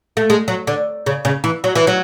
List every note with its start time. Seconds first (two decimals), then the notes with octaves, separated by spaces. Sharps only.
0.17 A3
0.30 G#3
0.48 F#3
0.67 D3
1.06 C#3
1.25 C#3
1.44 E3
1.64 F#3
1.75 E3
1.87 F#3